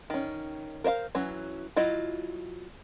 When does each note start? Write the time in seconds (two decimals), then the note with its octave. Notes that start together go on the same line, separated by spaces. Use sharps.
0.10 D#3 C#4
0.84 A#4 C5 E5 F5
1.15 E3 F#3 C#4
1.76 F#3 E4 F4 D#5